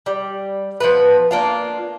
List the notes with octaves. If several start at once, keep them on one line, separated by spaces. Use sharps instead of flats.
G3
F3 B3 B4
A#3 D4 F4